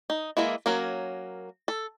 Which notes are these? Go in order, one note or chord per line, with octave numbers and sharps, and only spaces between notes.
D#4
E3 G#3 A#3 E4
F#3 A#3 C#4 A#4
A4